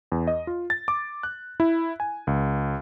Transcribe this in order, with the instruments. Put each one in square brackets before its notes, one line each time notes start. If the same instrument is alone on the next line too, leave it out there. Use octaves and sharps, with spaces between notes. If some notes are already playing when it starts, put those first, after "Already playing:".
[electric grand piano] E2
D#5
F4
A6
D6
F#6
E4
G#5
C#2